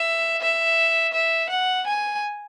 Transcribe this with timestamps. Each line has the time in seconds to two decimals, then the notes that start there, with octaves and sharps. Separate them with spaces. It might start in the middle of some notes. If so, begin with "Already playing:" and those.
Already playing: E5
0.42 E5
1.14 E5
1.50 F#5
1.87 G#5